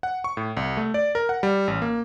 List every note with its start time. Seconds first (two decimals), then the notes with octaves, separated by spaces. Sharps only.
0.03 F#5
0.24 C#6
0.37 A2
0.57 C2
0.77 A3
0.94 D5
1.15 A#4
1.29 F#5
1.43 G3
1.68 A1
1.82 A#3